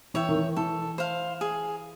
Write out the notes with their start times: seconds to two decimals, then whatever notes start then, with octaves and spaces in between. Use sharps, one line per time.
0.14 E3 C#5 E5 G5
0.29 D#3
0.35 E3
0.56 E3 A4
0.98 C5 F5
1.41 G#4